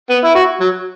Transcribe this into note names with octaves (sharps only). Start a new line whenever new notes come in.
B3
E4
F#4
F#3